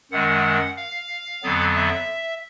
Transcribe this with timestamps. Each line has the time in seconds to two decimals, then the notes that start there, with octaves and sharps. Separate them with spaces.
0.12 F#2 D#3 G#3 F#5
0.77 F5
1.43 F2 D3 F#3 B3
1.75 E5